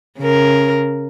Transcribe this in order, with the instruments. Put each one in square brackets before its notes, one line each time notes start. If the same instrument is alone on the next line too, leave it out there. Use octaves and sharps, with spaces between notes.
[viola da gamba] C#3 A#4